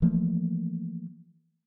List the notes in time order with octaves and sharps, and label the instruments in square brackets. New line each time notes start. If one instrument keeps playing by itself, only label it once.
[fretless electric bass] E3 F3 A3 A#3